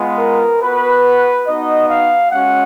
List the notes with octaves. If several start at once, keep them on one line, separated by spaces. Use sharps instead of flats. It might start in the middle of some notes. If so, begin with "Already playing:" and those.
Already playing: G#3 B3 F4
A#4
B3 F#4 B4
B3 D#4 F#4 D#5
F5
G#3 C#4 F#4 F#5